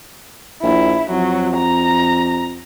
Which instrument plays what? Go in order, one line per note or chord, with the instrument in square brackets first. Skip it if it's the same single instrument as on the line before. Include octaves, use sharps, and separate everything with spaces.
[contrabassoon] A#1 [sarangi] E4
[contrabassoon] F2 [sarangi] F#3
[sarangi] A#5